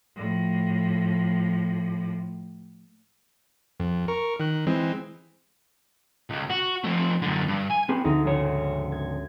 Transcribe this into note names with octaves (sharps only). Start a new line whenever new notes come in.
A2 F3
F2
A#4 C#6
D#3 F#6
E3 G#3 C4
C#2
F#4
F3 A3
F#2 D3
G2
G#5
C4 G#4 B4
D2 D#4
G#2 C#3 C#5
G#6